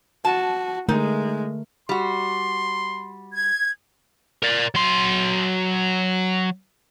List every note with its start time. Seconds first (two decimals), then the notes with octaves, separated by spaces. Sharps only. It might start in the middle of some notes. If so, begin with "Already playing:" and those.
0.25 F#4 A5
0.89 D3 G#3 A3 D#4 A#4
1.89 G3 F#4 C6
3.33 G#6
4.43 A#4 D5
4.75 F#3 C6